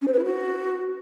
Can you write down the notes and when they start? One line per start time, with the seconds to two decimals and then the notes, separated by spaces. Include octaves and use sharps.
0.02 C#4
0.07 C5
0.13 B4
0.19 E4
0.24 F#4